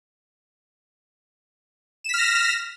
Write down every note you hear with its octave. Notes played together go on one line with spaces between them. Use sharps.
F6 A#6 B6 E7